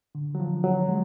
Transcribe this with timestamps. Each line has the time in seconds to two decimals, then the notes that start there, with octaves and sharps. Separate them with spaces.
0.15 D3
0.35 F#3
0.40 F3
0.64 F#3
0.89 G#3